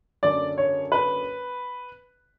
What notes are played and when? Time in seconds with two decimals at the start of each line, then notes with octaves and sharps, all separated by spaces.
0.23 F#1 F#2 D3 D5
0.58 C#5
0.92 B4